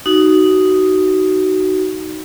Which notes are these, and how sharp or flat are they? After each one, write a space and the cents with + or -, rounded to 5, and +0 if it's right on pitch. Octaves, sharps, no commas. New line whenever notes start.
D#4 +0 F#4 +20